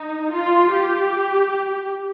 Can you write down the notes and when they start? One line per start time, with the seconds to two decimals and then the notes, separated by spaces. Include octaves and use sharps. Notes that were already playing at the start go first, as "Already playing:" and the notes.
Already playing: D#4
0.31 F4
0.71 G4